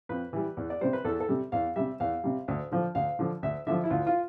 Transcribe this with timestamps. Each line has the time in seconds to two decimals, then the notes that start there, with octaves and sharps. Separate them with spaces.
0.09 F2 B4
0.33 E3 G3
0.57 E2
0.70 D5
0.81 C3 G3 C5
0.93 B4
1.05 E2 A4
1.20 A4
1.29 C3 G3
1.52 E2 F5
1.76 C3 G3 E5
2.00 E2 F5
2.24 C3 G3
2.48 D2
2.72 D3 F3
2.95 D2 F5
3.19 D3 F3
3.43 D2 E5
3.67 D3 F3 E5
3.84 E4
3.90 D2 F4
4.07 F4